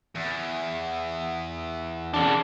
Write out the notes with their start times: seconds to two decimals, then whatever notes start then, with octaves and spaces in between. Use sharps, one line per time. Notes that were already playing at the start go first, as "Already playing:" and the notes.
0.15 E2
2.14 C#3 D4